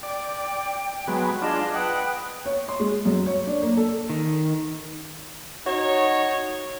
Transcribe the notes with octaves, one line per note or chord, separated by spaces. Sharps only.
D5 G5
F#3 G#3 B3
D4 F4 G#4 D#5 A5
B4 F#5 G5 D#6
C#5
C6
G#3
F#2
C#5
D4
A#3
A4
D#3
D#4 F#4 C#5